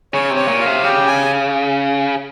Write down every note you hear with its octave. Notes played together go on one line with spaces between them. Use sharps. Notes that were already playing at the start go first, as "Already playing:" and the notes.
C#3 C#5
C3
C#5
A#2
F5
C3
C#3 G4
G#5